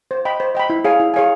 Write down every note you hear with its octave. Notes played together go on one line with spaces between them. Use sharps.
C5
D#5 G5 B5
C5
D#5 G5 B5
E4
G#4 C#5 F5 G#5
E4
G#4 C#5 F5 G#5